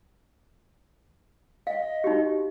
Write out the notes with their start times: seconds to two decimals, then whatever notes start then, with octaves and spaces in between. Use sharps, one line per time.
1.67 D#5 F5
2.04 D#4 F#4 G4